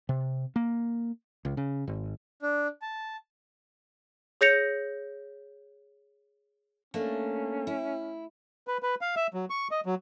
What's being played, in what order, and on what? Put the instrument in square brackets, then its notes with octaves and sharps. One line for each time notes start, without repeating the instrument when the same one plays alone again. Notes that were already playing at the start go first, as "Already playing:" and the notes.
[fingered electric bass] C3
A#3
C#2
C#3
G#1
[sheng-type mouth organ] D4
A5
[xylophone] G#4 C#5 G6 A#6 C#7 F7
[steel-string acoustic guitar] A3 A#3 D4 [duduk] C#4
[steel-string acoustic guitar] E4
[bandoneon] B4
B4
F5
E5
F#3
C#6
D#5
F#3